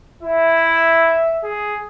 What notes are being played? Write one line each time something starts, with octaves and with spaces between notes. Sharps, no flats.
E4 E5
G#4